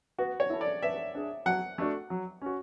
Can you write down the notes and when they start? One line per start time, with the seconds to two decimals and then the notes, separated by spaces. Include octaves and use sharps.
0.18 B3 F#4
0.40 C#5
0.50 E4 A4
0.61 D5
0.82 B3 E5
1.15 D4 G#4
1.46 F#3 F#5
1.78 A3 D4 F#4
2.10 F#3
2.42 C#4 F#4